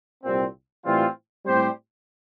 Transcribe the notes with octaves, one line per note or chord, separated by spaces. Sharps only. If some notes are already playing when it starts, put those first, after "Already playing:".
C2 A#2 G3 C4
A2 E3 G3 C4 F4
A2 G3 C4 G4 C5